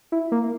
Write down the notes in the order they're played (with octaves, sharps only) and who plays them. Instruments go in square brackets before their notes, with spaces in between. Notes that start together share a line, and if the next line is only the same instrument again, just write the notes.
[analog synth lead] E4
A#3